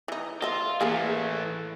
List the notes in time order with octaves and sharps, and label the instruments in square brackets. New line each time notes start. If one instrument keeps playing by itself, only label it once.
[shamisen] E3 D#4
[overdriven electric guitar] F4 [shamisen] D#5 E5
[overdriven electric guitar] E3 A3 [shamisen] A#3 G#4 A#4